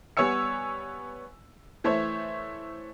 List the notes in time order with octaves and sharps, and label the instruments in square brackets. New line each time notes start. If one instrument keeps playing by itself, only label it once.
[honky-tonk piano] G3 B3 C#5 G#5 E6 C#7
E3 A3 C5 C#5 E5